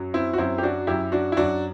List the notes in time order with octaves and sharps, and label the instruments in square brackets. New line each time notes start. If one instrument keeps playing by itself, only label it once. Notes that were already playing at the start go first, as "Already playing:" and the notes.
Already playing: [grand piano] F#2 F#3
C4 E4
F#4
F#2 F#3 C4 E4
G4
D4 F#4
F#2 F#3 E4 G4
D4 F#4
E4
F#2 F#3 D4 F#4